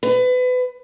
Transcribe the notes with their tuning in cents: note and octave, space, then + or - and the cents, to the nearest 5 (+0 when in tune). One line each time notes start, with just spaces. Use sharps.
B4 +30